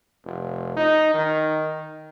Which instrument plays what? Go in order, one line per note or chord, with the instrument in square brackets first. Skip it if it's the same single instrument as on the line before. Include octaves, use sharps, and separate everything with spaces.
[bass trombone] F1
D#4
D#3